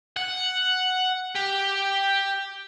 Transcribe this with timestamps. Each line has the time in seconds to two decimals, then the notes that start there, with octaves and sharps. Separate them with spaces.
0.17 F#5
1.36 G4